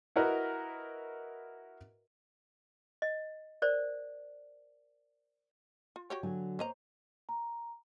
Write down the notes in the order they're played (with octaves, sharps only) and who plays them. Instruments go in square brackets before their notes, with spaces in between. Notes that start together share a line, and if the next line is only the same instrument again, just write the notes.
[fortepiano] E4 F#4 A#4 B4 D#5
[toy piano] D#5
A#4 C5 D5
[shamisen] F4
F#4 G4 C#5
[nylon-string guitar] D3 F#3 G#5
[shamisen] A#3 D#5 A#5 [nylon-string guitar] C5 C#5
[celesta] A#5